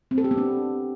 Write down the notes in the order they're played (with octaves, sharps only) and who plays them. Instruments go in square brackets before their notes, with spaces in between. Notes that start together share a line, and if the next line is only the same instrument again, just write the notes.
[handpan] C4
A4
G4
B3
D4